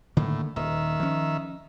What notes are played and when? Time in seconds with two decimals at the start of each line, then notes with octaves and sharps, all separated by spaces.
0.17 A2 D3 D#3 A#3
0.56 D#1 D#3 E5
1.00 F3 C#4